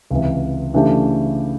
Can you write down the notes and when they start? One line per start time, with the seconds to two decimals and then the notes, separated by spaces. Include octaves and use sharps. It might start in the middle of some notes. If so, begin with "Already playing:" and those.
0.11 C#2 C3 E3
0.74 C#3 E3 A3 D4 G4